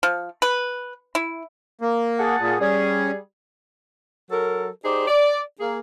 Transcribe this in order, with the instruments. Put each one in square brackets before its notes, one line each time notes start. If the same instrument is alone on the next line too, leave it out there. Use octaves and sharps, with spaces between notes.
[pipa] F3
B4
E4
[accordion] A#3
[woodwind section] G#4 F#5 A5
[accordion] A#2
[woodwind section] G3 G#4 [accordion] C#4
[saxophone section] F#3 A4 A#4
D#4 G4 G#4 C5 D5
D5
A#3 G#4